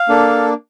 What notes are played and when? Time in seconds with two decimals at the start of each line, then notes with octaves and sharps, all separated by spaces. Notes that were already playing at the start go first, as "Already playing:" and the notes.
Already playing: F5
0.09 A#3 D4 A4